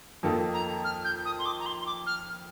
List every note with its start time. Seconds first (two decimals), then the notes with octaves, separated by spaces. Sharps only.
0.23 F2 D#3 A#3 D#4 A4
0.53 A#5
0.84 F6
1.05 G6
1.25 D#6
1.39 C6
1.46 D6
1.59 A#5
1.66 C6
1.81 C6
1.86 D6
2.07 F6